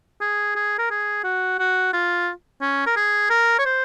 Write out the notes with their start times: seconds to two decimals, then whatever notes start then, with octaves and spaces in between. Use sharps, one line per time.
0.21 G#4
0.55 G#4
0.79 A#4
0.90 G#4
1.24 F#4
1.59 F#4
1.93 F4
2.61 C#4
2.86 A#4
2.96 G#4
3.30 A#4
3.59 C#5
3.65 C5